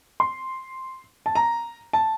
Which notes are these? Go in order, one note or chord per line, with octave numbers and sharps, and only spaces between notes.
C6
A5
A#5
A5